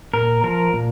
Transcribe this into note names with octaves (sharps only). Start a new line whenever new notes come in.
A#2 A#4
F3 A#4
A#2